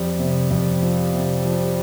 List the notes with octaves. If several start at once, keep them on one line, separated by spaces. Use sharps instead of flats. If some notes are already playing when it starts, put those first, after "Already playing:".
Already playing: F2 G3
C3
F2
F3
C3
F3